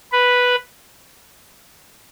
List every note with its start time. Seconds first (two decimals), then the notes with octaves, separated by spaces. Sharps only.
0.12 B4